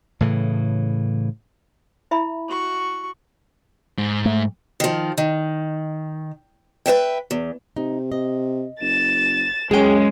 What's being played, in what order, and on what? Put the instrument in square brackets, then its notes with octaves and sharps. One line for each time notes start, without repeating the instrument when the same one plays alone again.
[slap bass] A2 C#3 E3
[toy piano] E4 E5 B5
[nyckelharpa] F#4 C#6
[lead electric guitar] G#2
[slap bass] A3
[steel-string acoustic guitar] D#3 F3
D#3
B4 C5 E5 G5
E2
[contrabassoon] C3 [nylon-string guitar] D#4
[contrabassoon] C3 [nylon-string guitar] D#5
[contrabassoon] F#1 [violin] A6 E7
[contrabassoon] F#2 [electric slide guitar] G#3 [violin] C#4 [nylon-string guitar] G#4 G5